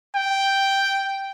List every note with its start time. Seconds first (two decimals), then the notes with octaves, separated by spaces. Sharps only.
0.16 G5